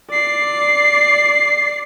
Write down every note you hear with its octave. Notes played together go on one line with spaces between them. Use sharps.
D5 C7